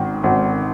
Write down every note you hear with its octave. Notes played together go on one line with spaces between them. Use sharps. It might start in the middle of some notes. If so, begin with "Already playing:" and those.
Already playing: G#1 D#3
G#1